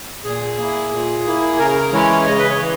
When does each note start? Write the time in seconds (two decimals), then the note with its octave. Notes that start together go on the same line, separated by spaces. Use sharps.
0.24 A#2 G#4
0.58 A#3 E4
0.92 A#2
1.26 A#3 E4
1.59 C#3 A#4
1.93 E3 G#3 C#4 E4 C#5
2.27 C#3 D#5
2.39 B4
2.50 C#5
2.60 E3